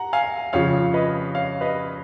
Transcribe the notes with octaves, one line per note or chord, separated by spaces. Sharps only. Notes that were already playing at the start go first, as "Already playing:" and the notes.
Already playing: F#5 A#5
F5 G#5
F2 C#3 F3 C#5 F5
B4 D#5
C#5 F5
B4 D#5